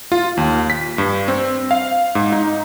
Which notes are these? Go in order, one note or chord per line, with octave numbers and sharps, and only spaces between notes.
F4
D#2
B6
G2
C4
F5
G#2
D#4